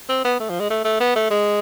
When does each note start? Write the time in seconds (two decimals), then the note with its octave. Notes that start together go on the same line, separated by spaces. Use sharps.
0.09 C4
0.25 B3
0.40 A3
0.50 F3
0.60 G#3
0.71 A3
0.85 A3
1.00 B3
1.16 A3
1.31 G#3